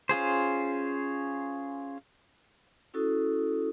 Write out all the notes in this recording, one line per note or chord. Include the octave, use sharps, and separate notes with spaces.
C#4 F4 G#4 C5
C#4 E4 F#4 A4 D#6